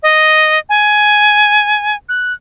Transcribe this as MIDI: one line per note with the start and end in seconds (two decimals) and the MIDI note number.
0.03 0.59 75
0.69 1.96 80
2.09 2.33 90